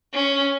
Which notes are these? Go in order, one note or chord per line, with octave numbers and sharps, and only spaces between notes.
C#4